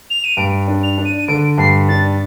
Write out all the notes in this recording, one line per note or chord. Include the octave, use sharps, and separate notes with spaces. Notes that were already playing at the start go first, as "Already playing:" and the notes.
F7
D#7
G2 D7
D4
F7
D4
D#7
D#7
D3 D7
G2 C7
D4 A6